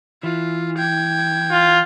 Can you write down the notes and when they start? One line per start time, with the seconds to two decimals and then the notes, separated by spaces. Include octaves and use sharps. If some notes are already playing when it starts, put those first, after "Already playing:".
0.23 E3 F4
0.78 G5 G#6
1.51 F4